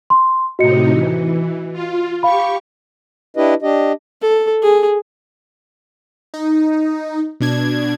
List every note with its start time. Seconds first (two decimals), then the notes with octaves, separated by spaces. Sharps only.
0.10 C6
0.59 A2 C3 D#4 F#4 D#5 C#7
0.91 E3
1.73 F4
2.23 G4 F5 B5 C#6
3.37 D4 E4 G4 B4 D#5
3.62 D4 G4 D#5
4.22 A4
4.62 G#4
6.34 D#4
7.40 B2 D4 G#6